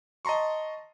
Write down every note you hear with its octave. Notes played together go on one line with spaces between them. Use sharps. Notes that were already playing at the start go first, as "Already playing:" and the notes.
D#5 A5 A#5 C6 C#6